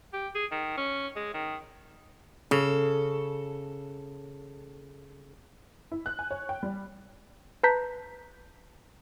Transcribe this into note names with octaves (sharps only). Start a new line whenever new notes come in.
G4
G#4
D#3
C#4
G#3
D#3
C#3 A4
E4
F#6
G#5
C#5
G5
G3
B4 A5 A#5 G6 B6